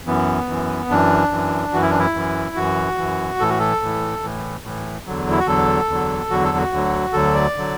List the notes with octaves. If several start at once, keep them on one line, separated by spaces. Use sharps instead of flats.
F#2 E3 B3
F#2 E3
F#2 E3 D4
F#2 E3
F#2 E3 F#4
E4
D4
E4
F#2 E3
F#2 E3 F#4
F#2 E3
A2 E3 A4
F#4
A4
A2 E3
A2 E3
A2 E3
E2 D3 F#3
E4
F#4
E2 D3 F#3 A4
E2 D3 F#3
E2 D3 F#3 F#4
A4
F#4
D2 D3 F#3
D2 D3 F#3 A4
D5
D3 F#3